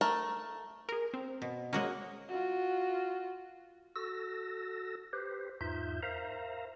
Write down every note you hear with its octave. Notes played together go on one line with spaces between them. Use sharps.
A3 A#4 A5
G#4 A#4
C4
B2
G#3 A#3 C#4 F#4 D#5
F4 F#4
F#4 A4 E6 A#6
G4 B4 C5
E2 G#2 D#4 F4 E5 G6
A#4 C5 E5 F5 A#5